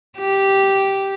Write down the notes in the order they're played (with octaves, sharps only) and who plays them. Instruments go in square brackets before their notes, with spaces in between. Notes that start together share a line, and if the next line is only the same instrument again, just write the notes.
[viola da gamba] G4